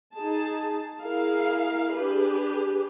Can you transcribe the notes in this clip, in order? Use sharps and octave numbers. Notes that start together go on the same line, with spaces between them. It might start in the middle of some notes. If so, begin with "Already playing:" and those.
D#4 G#4 A5
E4 G#4 A#4 F5
D4 G4 G#4 B4